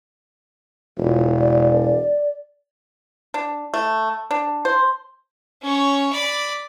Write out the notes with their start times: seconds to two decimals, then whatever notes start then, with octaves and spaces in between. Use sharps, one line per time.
0.97 E1 F4
1.37 D5
3.34 D4
3.74 A3
4.31 D4
4.65 C5
5.62 C#4 C#5
6.12 D5 B5